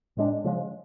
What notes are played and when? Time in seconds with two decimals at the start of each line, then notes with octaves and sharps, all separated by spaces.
0.17 A2 G#3 D4
0.44 C#3 F3 G#3